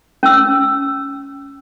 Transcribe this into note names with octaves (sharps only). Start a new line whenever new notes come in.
C#4 E6